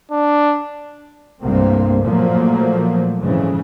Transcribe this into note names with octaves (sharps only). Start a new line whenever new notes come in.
D4
C2 G2 A3 A#3 C4
A#2 F3 F#3 A3 A#3
F2 G#2 C#3 E3